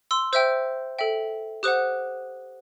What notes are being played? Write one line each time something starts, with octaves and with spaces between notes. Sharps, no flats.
C6 E6
C5 E5 G5 E6 G6
A4 E5 G5
G4 C5 F#5 D#6 F#6